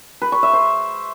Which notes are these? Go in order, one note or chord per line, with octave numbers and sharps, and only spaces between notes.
B4
C#6
E5
C5